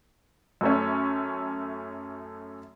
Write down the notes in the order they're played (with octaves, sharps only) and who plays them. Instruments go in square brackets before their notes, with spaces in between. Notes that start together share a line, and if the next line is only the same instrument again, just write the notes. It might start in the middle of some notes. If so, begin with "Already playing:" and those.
[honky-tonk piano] F#2 A3 C#4